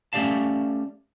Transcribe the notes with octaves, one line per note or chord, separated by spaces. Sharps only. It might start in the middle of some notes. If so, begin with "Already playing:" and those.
A3 C#4 G4 D5 F5 A5